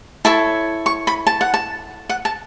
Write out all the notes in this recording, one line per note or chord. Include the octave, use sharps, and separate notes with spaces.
E4 A4 C#5 A5
C#6
B5
A5
F#5
A5
F#5
A5